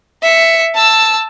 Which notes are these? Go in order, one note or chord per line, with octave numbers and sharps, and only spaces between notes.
E5 C#7
A5 E6